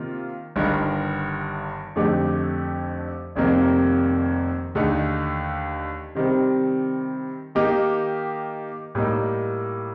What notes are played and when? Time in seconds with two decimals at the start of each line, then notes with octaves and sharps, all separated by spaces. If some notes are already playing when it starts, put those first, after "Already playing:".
Already playing: C3 D#3 A#3 F4
0.56 G1 G2 D#3
1.96 F2 D3 A3 D#4 G4
3.35 F1 F2 C3 D#3 A#3
4.75 D#2 D3 A3 D#4
6.15 C3 D#3 G3 C4
7.55 D#3 A#3 D#4 G4
8.95 A2 G3 A#3 D#4